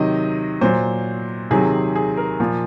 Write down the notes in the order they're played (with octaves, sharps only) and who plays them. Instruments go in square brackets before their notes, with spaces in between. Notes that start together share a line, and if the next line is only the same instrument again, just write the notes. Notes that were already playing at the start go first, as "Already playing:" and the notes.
Already playing: [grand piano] C3 D#3 F#3 D#5
A#2 F#3 C5
C3 D#3 F#3 G#4
G#4
A#4
A#2 F3